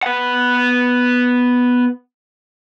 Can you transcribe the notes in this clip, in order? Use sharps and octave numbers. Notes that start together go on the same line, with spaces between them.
B3 F#5